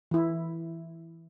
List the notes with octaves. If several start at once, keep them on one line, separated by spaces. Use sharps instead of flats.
E3 E4